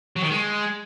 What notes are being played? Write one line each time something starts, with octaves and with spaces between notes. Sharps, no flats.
F#3
D#3
G#3